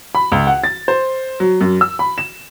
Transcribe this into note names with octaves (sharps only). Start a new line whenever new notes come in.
B5
C#2
F#5
A6
C5
F#3
F#2
E6
B5
E7